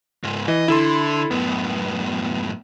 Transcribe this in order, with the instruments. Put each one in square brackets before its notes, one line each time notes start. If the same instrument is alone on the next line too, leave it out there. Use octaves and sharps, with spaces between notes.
[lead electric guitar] C#2 G#2
[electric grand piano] E3 [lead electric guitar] D#5
[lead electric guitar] D3 [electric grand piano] E4 A4 C6
[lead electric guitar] F#2 A2 [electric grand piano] B3